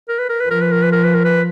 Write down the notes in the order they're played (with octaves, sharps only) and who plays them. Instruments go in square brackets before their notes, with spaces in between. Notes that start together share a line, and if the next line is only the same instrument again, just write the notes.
[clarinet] A#4
B4
A#4
B4
[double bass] F3 [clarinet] A#4
[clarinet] B4
A#4
B4
A#4
B4
A#4
B4